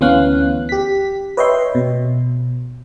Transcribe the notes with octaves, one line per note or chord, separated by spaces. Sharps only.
D2 E3 B3 C#4 F5 F#6
G4 B6
B4 C#5 D#5 E5 G5 C6
B2